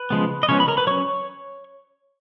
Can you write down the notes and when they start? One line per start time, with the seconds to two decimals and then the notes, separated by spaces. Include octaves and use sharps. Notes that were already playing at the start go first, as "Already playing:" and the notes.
Already playing: B4
0.10 C#3 F3 G#3 B3
0.43 D#5
0.49 C#3 F3 G#3 B3 C#4 C#5
0.60 B5
0.68 A#4 A#5
0.77 B4 B5
0.87 F#3 C#4 C#5 C#6